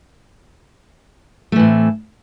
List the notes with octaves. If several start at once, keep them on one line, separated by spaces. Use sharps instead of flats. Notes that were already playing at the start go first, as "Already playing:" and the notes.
A2 E3 A3 C4